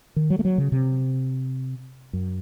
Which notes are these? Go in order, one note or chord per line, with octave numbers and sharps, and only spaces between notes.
D#3
F#3
A3
F#3
C#3
C3
F#2